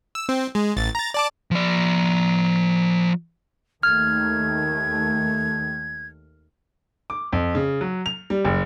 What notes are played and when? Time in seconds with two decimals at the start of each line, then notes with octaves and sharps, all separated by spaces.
0.15 E6
0.29 C4
0.55 G#3
0.77 A1 A6
0.95 A#5 A6
1.14 D5 A5 D6
1.51 F3 D5
3.83 D#2 D#3 A3 F6 G#6
7.10 D6
7.33 F2
7.55 C#3
7.81 F#3
8.06 F7
8.30 G3
8.45 F#1